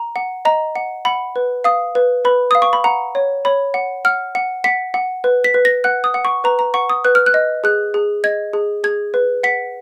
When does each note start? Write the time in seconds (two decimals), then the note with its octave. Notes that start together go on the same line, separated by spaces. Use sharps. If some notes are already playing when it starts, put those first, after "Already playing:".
Already playing: A#5
0.16 F#5
0.45 D#5 A#5
0.76 F#5
1.05 F#5 B5
1.36 B4
1.64 F5 D#6
1.95 B4
2.25 B4 B5
2.51 F5 D#6
2.62 C#6
2.73 B5
2.84 F#5 A#5
3.15 C#5
3.45 C#5 B5
3.74 F#5
4.05 F#5 F6
4.35 F#5
4.64 F#5 B6
4.94 F#5
5.24 B4
5.44 B6
5.54 B4
5.65 A#6
5.84 F#5 F#6
6.04 D#6
6.14 F#5
6.25 C#6
6.44 B4 A#5
6.59 A#5
6.74 F#5 C#6
6.90 D#6
7.04 B4 F#6
7.15 F6
7.26 F#6
7.34 D#5
7.64 G#4 F#6
7.94 G#4
8.24 D#5 G#6
8.53 G#4
8.84 G#4 G#6
9.14 B4
9.43 F#5 B6